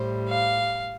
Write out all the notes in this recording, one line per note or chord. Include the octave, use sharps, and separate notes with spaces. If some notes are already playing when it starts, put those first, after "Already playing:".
Already playing: A2 G3 C5
F5